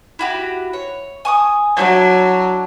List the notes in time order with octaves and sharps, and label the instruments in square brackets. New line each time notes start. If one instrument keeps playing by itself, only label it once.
[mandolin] E4 F#4 G4
C#5
G#5 C#6 D#6
[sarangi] F#3 [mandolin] D4 E4 D5